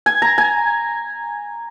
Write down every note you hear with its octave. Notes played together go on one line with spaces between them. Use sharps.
G#5
A#5
G#5